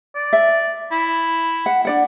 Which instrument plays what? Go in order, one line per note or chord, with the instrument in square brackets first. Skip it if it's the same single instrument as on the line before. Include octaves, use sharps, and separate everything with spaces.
[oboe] D5
[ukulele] E5
[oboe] E4
[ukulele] F#5
D4 D5 F#5